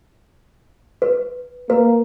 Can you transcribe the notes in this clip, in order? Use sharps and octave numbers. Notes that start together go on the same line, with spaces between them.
B4
A#3 B4